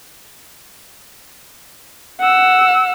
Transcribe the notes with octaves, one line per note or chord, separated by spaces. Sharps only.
F#5 E6